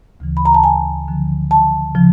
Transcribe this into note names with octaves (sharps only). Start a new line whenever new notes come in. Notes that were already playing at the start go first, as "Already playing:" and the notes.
D2 C#3 E3
B5
A#5
A5
G#5
D2 D3 F3
A5
C#3 F3